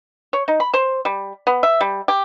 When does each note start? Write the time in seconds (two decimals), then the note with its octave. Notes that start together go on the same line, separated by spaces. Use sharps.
0.33 C#5
0.48 D#4
0.60 B5
0.74 C5
1.05 G3
1.47 B3
1.63 E5
1.81 G3
2.08 G4